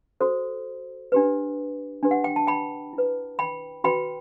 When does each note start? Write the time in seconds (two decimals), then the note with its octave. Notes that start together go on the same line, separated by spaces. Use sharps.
0.20 F#4 A4 C5
1.12 D4 G4 B4
2.03 D4 G4 B4
2.11 F#5
2.24 G5
2.36 A5
2.47 G5 B5
2.93 E4
2.98 B4
3.39 G5 B5
3.84 F#4 B4 G5 B5